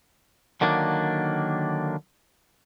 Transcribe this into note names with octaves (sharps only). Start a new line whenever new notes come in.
D3 D#3 F#3 A#3 D4